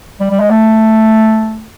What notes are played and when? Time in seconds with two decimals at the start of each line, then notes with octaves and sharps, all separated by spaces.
0.20 G3
0.30 G3
0.40 G#3
0.50 A3